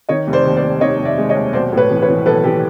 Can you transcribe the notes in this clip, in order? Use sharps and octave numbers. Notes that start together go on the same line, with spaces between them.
D#3 C#5 D#5
F1
C5 D5
D#2
C5 D5
F1
D#3 C#5 D#5
F1
D5 E5
G#3
C#5 D#5
D#2
B1 C5 D5
A2
B4 C#5
E3
B4 C#5
E3
B1 A4 B4
E3 G4 A4